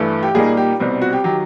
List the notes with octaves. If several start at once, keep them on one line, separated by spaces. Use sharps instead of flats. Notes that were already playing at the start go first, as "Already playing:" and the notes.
Already playing: G2 E3 A3
G4
A#2 G3 A#3 D#4 G#4
G4
C2 B2 G3 C4
F#4
G4
D#3 F#3 G4